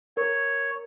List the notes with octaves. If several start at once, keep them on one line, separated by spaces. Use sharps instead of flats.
A#4 C#5